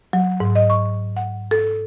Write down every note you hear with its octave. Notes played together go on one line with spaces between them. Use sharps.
F#3
G#2
D#5
C#6
F#5
A4